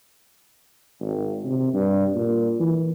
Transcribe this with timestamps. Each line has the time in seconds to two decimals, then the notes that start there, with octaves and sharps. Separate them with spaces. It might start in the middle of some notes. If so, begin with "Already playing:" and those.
1.01 G#1
1.45 C3
1.74 G2
2.15 A#2
2.60 E3